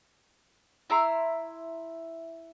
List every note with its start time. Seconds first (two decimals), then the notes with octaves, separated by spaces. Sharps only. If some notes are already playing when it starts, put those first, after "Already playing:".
0.90 E4 E5 A#5 C6